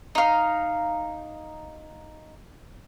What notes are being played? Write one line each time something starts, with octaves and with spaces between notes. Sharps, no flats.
D#4 F5